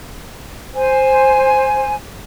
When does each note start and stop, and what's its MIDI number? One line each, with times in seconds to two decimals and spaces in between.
0.75 1.94 72
0.75 1.94 80